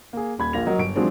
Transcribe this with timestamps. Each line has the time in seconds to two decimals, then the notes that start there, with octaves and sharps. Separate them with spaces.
0.13 A#3 G#4
0.39 D#1 B5 G#6
0.53 A#1 A#3 F4 A#6 F7
0.66 F#3 A#4 D#5
0.78 G1 D7
0.96 D#3 F3 F#3 G#3 C4 D4